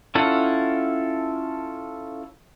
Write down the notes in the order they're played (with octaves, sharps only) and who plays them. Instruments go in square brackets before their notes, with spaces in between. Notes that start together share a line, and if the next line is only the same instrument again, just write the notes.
[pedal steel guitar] C#4 E4 F4 A4 F#5